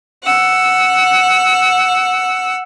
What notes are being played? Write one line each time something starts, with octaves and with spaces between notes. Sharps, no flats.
F#5 E6